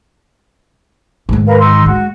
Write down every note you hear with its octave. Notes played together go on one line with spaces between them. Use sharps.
G#2 D#3
A#4 B4 F5
D#4 C6 E6
G#3 F#4